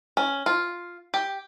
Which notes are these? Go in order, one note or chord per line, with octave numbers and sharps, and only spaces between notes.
C#4
F4
G4